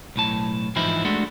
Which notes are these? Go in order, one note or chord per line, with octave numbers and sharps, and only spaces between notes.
B1 A2 A5
G#2 E3 F3 D#4 E4
G#3 A3 D4 F#4